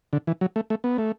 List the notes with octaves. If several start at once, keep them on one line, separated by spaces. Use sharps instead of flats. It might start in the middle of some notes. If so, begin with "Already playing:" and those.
D3
E3
F#3
A3
A3
B3
A3